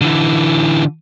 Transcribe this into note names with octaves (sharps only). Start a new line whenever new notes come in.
D3 E3